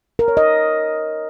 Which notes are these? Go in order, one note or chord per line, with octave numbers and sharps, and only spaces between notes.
A#4
C#5
D#5